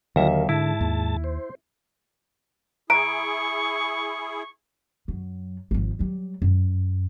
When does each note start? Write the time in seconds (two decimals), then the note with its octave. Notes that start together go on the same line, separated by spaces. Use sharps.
0.16 D#2 D3 F#3 F4 E5 A#6
0.33 A#4
0.49 G#2 D3 E4 A5
0.81 D#2
1.24 C5
2.90 E4 G#4 A#5 C#6 D7
5.08 F#2 F#3
5.71 G#1 F3
5.99 F#3 G3
6.42 F#2